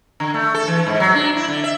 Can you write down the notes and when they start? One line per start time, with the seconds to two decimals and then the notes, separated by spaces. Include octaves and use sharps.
0.20 D3
0.34 A3
0.54 A4
0.68 E3
0.87 G#2
1.00 F#3
1.15 D4
1.36 E4
1.48 D3
1.64 E5